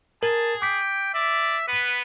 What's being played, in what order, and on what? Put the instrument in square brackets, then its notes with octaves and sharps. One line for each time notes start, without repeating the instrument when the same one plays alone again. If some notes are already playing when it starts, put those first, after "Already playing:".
[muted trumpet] G#4 [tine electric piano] A#4 [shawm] A5
[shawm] G5 [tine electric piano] D6 B6
[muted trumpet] D5 [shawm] E5
[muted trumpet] B3 [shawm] B4